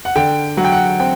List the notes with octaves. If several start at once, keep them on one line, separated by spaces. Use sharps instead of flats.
F#5
D3 G5
F#3 F#5
G5
F#5
C4 G5